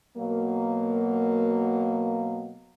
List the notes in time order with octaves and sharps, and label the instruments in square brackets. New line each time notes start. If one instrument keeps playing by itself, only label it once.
[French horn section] B2 F#3 A#3